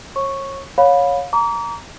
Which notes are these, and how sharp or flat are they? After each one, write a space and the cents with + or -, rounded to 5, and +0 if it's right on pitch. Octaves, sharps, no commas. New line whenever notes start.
C#5 -35 C#6 +0
C#5 +0 F5 +30 B5 +0
A#5 +0 D6 -40